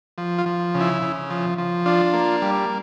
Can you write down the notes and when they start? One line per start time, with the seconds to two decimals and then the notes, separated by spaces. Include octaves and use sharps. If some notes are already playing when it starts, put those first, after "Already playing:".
0.18 F3
0.38 F4
0.46 F3
0.74 C#3
0.81 E4
1.02 C#3
1.30 F3
1.58 F3
1.86 D4 F4
2.14 A#3
2.42 G3